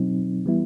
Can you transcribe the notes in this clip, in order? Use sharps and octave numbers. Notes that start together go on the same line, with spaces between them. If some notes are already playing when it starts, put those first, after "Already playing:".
Already playing: B2 F#3 C4 D#4
E3 G3 B3 E4